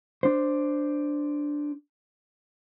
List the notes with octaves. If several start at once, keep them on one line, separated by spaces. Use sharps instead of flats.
D4 C5